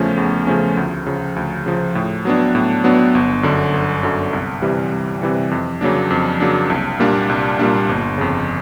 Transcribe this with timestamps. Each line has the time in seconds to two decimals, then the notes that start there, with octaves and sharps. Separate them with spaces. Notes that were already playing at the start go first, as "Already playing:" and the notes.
Already playing: E2 C#3 F3 A3 C#4
0.17 E2
0.47 C#3 F3 A3 C#4
0.77 D2
1.07 C#3 F3
1.36 D2
1.66 C#3 F3
1.95 A2
2.25 F#3 B3 D4
2.55 A2
2.84 F#3 B3 D4
3.15 G1
3.43 F#2 D3
3.74 G1
4.03 F#2 D3
4.33 C2
4.62 C3 E3 G3
4.92 C2
5.22 C3 E3 G3
5.51 F2
5.81 C#3 F#3 A#3 D4
6.10 F2
6.40 C#3 F#3 A#3 D4
6.70 C2
7.00 A#2 G3 A#3 D4
7.29 C2
7.59 A#2 G3 A#3 D4
7.89 G1
8.18 F2 C#3